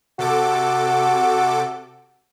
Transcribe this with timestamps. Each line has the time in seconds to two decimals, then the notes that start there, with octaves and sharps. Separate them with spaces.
0.19 C3 F#4 A4 D6